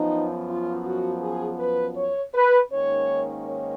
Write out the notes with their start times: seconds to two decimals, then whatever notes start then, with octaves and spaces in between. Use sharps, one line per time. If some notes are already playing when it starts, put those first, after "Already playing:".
Already playing: F#2 F3 B3 D#4
0.49 F4
0.86 F#4
1.22 G#4
1.60 B4
1.96 C#5
2.34 B4
2.70 G#2 D#3 A#3 C#4 C#5
3.45 C#5